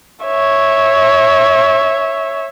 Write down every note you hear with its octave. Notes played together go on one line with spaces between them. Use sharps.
C#5 E5